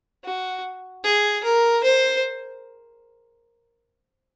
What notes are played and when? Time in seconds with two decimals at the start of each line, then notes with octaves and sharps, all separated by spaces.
0.24 F#4
1.04 G#4
1.44 A#4
1.84 C5